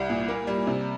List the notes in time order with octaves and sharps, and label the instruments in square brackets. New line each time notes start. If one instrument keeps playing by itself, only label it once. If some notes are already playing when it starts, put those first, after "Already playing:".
Already playing: [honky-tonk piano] C2 G3
A#2
A#3
G3
C3